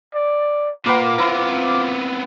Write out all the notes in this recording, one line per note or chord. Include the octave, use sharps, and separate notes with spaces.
D5
A#2 A#3 F4 A#4 B4 F#5 D6
B3 C4 E4 A#5